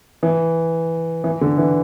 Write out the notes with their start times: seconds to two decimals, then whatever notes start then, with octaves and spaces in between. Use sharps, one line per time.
0.23 E3
1.24 E3
1.41 D3
1.58 E3